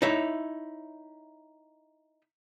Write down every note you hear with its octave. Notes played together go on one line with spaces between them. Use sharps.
D#4 E4 C#5 E5